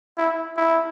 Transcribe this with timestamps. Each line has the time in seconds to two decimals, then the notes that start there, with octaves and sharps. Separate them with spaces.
0.18 E4
0.57 E4